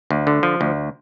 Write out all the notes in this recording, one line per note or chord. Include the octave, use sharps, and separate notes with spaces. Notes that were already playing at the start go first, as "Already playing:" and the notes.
D2
D3
F3
D2